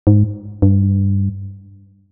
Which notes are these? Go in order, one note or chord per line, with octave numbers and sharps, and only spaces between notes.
G#2
G2